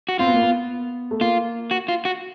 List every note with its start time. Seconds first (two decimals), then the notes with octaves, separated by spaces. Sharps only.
0.09 F#4
0.19 C4 F4
0.26 B3
0.34 A#3
0.42 B3
1.11 A3
1.21 A#3 F4
1.71 F#4
1.88 F4
2.05 F#4